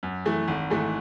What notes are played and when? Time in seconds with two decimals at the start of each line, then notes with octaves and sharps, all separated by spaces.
0.03 F#2
0.25 E3 A3
0.48 G#1
0.70 G#2 E3 A3